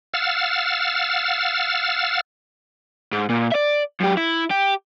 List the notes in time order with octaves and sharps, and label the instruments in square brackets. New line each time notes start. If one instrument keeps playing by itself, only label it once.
[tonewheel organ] F5 F#5 E6 F6 A6
[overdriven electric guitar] G#2
A#2
D5 E5
F#2 G4
E4
G4